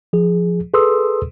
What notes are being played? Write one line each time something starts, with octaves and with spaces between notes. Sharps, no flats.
F3 G#4
G#4 A4 B4 C6 D#6 E6